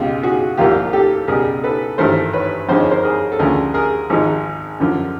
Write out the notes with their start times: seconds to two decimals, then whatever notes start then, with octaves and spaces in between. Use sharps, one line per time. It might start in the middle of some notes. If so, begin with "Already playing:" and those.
Already playing: C#2 B2 G#3 F4 G4
0.23 F#4 G#4
0.57 C2 A#2 F3 A#3 F4 G4
0.93 G4 A4
1.28 C#2 B2 G3 G#4 A#4
1.64 A4 B4
1.98 G#1 G2 E3 A3 A#4 C5
2.33 B4 C#5
2.69 F2 D3 F3 G#3 C5
2.80 C#5
2.91 A#4 C5
3.03 G#4 A#4
3.32 A4
3.39 D2 C#3 F3 G#4 A#4
3.74 G#4 A#4
4.10 G#1 G#2 F3 G#3
4.80 F#2 D3 F3